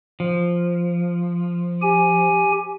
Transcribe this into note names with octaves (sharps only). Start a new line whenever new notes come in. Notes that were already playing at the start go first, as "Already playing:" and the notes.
F3
G4 G#5